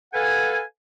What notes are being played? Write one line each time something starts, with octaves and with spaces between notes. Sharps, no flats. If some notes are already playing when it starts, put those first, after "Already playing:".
A4 B4 F5 F#5 G#5